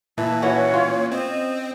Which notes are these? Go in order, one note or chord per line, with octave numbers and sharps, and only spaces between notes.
A#2 E3 A5
E3 C#4 F#4 C#5
F4
C4 D#5